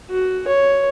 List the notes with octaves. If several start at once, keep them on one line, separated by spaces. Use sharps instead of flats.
F#4
C#5